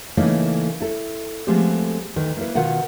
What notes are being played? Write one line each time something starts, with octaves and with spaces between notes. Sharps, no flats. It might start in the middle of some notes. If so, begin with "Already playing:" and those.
C#3 E3 A3 A#3 C#4 D#4
E4 A4
F3 G#3 A3 B3 C4 G4
D2 D#3 B4
A#3 E4 B4
B2 D#3 F4 F5 F#5